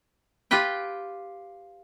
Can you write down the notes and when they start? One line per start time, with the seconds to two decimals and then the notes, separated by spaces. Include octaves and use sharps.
0.51 F4 G4 B4 G5